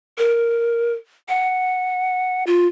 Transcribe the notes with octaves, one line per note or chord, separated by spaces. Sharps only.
A#4
F#5
F4